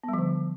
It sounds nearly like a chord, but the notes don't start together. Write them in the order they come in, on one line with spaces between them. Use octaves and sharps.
B3 G3 F3 D3